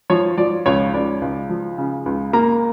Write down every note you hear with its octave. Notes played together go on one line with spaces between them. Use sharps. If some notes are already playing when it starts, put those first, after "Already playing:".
F3 C#5
F3 D5
C#2 C#5
C#2 D5
C#2
F3
C#3
C#2
A#3 A#5